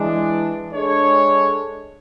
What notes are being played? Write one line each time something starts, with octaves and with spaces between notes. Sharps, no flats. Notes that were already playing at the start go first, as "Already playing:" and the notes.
Already playing: E3 G#3 D4
G#3 D4 A4 C#5